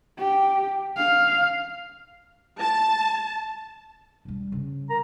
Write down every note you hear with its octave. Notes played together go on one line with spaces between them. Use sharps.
G4
F5
A5
E1 G3
C#3
A#4 A#5